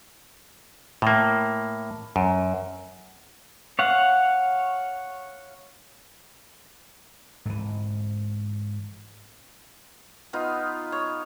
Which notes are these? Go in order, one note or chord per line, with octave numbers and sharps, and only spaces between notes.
A2 A#3
F#2
C#5 F5 F#5
G#2 E3
B3 D#4 F4 B4
C#5